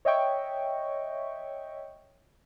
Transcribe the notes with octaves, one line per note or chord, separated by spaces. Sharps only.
C#5 D#5 E5 G5 C#6